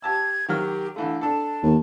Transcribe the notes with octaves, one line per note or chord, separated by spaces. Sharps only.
G4 A5 E6 G#6
D#3 F#3 G4 F6
D3 E3 A3 F5
D4 A4 A5
D#2